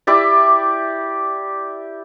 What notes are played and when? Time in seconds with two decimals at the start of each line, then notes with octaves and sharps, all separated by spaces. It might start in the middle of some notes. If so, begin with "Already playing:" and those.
0.07 E4 G4 D5